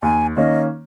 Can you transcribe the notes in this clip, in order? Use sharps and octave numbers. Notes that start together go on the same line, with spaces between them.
D#2 G#5
D#3 A#3 C#4 D#5